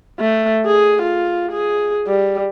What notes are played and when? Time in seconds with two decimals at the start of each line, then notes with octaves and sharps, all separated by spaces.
0.19 A3
0.66 G#4
1.02 F4
1.52 G#4
2.07 G3